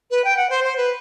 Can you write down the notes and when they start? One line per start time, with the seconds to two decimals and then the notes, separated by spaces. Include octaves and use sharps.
0.11 B4
0.24 G5
0.37 F#5
0.50 C5
0.64 C5
0.77 B4